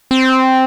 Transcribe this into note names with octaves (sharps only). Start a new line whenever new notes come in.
C4